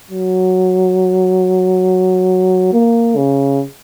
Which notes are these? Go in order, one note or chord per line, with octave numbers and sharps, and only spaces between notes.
F#3
A#3
C#3